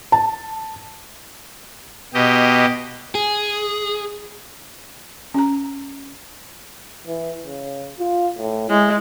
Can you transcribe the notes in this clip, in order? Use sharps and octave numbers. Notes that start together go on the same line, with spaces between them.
A5
B2 G4 D#5
G#4
C#4 A#5
E3
C#3
F4
A2
G#3 E4